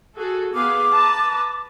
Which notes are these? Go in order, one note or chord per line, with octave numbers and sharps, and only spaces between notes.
F#4 G#4 A4
B3 G#4 F5 D6
B4 A5 A#5